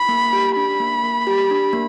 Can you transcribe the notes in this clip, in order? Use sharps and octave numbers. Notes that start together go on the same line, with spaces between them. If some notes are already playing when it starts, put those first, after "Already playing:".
Already playing: B5
A#3
G4
D4 B5
A#3
A#3
G4
D4
A#3